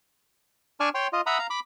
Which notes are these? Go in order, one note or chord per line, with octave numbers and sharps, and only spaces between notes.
D4 D5 G#5 A5 C#6 F6
C#5 G5 C6
F4 D#5
E5 F#5 A#5 B5 D#6
F5 A#5
B5 D6